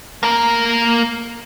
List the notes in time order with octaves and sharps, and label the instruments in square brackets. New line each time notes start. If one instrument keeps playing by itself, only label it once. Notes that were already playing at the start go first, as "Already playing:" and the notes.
[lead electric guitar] A#3 A#4